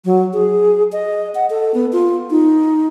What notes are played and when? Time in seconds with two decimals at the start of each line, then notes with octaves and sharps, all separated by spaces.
0.05 F#3
0.33 G#4
0.92 D#5
1.35 F#5
1.50 A4
1.74 B3
1.93 F4
2.30 D#4